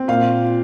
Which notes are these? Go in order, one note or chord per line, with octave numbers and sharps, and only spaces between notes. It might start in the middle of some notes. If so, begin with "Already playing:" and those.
Already playing: C4
A#2 F5